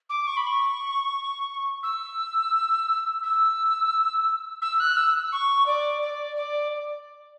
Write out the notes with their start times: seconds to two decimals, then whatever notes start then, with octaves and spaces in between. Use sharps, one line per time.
0.09 D6
0.27 C#6
0.37 B5
0.47 C#6
1.83 E6
3.23 E6
4.62 E6
4.80 F#6
4.97 E6
5.32 C#6
5.66 D5
6.02 D5
6.36 D5